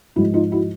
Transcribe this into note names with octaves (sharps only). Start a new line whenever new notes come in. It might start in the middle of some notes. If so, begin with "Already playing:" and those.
G#2 F3 G#3 E4 F#4
D#4 F4
E4 F#4